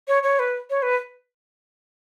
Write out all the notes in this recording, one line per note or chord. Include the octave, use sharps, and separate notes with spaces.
C#5
C#5
B4
C#5
B4